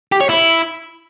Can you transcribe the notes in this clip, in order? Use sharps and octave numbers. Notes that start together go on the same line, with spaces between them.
G4
C#5
E4